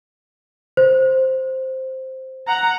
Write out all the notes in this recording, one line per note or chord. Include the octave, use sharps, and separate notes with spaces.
C5
F#5 A#5